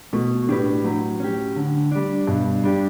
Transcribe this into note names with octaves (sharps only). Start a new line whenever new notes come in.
B2 A3
A2 D4 G4 B4
A2 F#3
C#4 G4
D3
G3 D4
G2 B2
G3 D4 G4